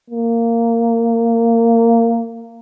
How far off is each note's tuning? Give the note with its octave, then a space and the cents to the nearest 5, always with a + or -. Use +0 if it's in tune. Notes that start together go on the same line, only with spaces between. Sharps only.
A#3 -15